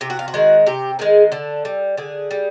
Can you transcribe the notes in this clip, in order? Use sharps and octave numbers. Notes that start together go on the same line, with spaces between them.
C3 G4
F#4
F4
F#4
D#3 G#3
C3 G4
D#3 G#3 G#4
D3 A4
G3
D3 G#4
G3